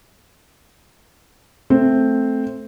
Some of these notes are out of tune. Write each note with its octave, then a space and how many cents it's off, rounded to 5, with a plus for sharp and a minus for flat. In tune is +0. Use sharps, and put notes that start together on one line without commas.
A3 +0 C4 +0